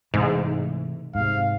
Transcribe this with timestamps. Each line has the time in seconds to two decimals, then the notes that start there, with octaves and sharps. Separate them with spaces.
0.14 G#2 C3 E3 A3
1.15 G#2 C3 F5